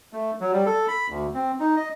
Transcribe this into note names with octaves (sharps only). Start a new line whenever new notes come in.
A3
F#3
G3
A4
B5
D2
C4
D#4
D#5